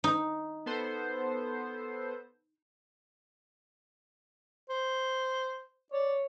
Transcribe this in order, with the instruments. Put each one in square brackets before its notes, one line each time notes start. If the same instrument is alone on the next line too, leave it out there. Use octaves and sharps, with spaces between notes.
[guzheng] D#4
[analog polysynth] B3 A4 C5
[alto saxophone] C5
[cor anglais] C#5 [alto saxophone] D5